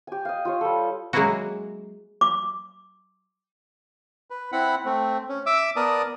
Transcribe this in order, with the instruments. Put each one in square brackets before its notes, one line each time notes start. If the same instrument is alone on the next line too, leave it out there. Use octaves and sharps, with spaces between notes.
[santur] G4 G#5
D#5 F5
F4 G4 C#5
G3 A4
[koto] F#3 G#3 A#3 C#4 E4 F#4
[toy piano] D6
[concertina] B4
C4 E4 F#5 B5
A3 C4
C#4
E5 D6 E6
B3 A#4 D5 A5 D#6